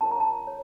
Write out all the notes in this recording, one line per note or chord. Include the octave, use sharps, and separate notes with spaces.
C#4 F4 A#4 C#5 A5
A#5
A5
C#5